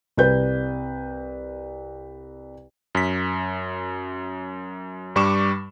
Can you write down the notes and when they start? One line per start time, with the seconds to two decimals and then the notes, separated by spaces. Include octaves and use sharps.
0.17 C2 B4 G6
2.95 F#2 B6
5.16 G2 G3 C#6 D6 E7